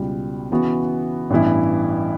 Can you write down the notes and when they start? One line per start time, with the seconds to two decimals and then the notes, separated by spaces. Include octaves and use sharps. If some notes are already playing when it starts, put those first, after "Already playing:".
Already playing: C#2 B2 G3
0.50 C#3 E3 B3 F#4
1.30 A1 G2 E3 B3 E4